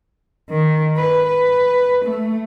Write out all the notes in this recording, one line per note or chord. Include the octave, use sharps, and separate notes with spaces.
D#3
B4
B4
A3